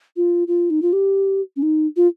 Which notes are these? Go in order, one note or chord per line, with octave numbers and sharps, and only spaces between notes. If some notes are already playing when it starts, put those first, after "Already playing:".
F4
F4
D#4
F4
G4
C#4
D#4
F4